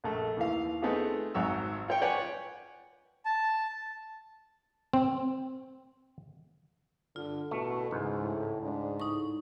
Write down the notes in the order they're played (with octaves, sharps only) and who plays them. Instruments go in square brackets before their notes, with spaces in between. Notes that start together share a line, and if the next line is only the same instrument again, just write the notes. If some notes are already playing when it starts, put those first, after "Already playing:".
[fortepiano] A#1 A3
D#2 E3 F5
A3 B3 C4 D#4 F4 G#4
G#1 G#2 F#3 E6
F4 C#5 G5
B4 C#5 D5 F#5 G#5
[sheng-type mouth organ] A5
[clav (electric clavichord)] C4
[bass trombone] G2 [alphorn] D3 [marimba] F4
[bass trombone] A1 [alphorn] B2 [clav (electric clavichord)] A3
[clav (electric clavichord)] C#2 [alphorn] G#2 [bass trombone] E3
[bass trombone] A2
[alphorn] G#2 [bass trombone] D4
[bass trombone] A2 [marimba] D#4 C#6